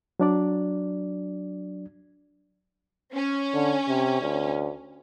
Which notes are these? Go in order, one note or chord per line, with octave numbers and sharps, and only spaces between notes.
F#3 D4 D5
C#4
D3
C3
D2